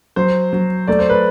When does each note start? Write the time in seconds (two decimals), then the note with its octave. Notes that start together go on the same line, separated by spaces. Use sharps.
0.16 F#3 C5
0.53 F#3
0.88 A3 D5
0.99 C5
1.10 B4